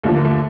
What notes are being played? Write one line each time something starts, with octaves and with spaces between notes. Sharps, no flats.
D#2 D3 F3 A3
A#3
A3